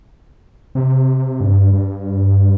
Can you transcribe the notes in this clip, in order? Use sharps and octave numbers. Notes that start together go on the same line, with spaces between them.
C3
G2
G2